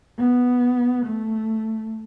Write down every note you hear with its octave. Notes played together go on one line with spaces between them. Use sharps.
B3
A3